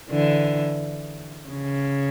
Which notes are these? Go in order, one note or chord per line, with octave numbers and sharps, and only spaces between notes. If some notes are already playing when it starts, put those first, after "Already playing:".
D3 E3
C#3